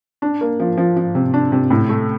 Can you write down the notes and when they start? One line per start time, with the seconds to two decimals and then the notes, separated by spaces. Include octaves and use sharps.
0.22 D4
0.41 A#3
0.60 F3
0.77 F3
0.97 F3
1.15 C3
1.34 D4
1.52 C3
1.70 A2
1.89 A3